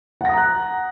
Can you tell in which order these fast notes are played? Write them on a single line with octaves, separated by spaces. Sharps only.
F#5 A#6 D#6 A#5 F#6